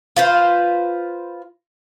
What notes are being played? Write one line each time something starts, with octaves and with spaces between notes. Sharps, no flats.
F4 B4 C5